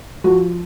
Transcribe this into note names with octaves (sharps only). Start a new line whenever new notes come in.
F3 F#4